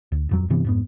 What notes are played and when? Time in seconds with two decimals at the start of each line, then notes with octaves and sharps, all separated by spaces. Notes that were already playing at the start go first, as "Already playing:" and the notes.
0.12 D2
0.29 D#1 F2 F#3
0.50 G2 C3 E3 B3
0.65 F2 G#2 B3